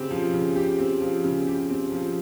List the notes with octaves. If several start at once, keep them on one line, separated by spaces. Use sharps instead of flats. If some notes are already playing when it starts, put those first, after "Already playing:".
Already playing: C#3 C4 G4
F3
C#3
G4
C4
F3
C#3
G4
C4
F3